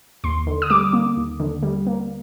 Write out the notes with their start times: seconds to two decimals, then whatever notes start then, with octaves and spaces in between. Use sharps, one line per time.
0.24 D#2 C6
0.47 D3
0.62 D#6
0.70 G3 D6
0.93 A#3
1.17 D#2
1.40 D3
1.63 G3
1.87 A#3